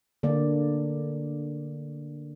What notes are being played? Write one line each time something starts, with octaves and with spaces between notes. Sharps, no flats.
D3 A#3 D5